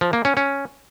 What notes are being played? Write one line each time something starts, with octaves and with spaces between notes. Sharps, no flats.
F3
A#3
C#4
C#4